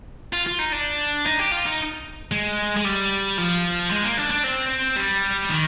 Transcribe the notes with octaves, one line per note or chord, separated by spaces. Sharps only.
F4
F4
D#4
D4
D#4
G4
F4
D#4
G#3
G#3
G3
F3
G#3
A#3
D4
D4
C4
G3
D#3